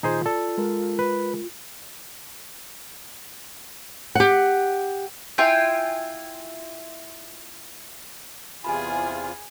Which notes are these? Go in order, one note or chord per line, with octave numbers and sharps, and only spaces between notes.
A#2 D#3 D#4 F4 G#4 C5
A4 D5
G#3 A#4
B4
G4 F#5
E4 F4 G5 G#5
E2 C3 F4 G#4 G#5 B5